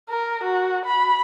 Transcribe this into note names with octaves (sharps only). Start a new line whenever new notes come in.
A#4
F#4
B5